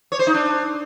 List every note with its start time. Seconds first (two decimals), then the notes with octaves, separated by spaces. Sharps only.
0.12 C#5
0.19 C5
0.27 D#4
0.34 D4